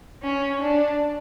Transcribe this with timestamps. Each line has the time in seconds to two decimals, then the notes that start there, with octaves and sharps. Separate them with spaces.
0.22 C#4
0.61 D4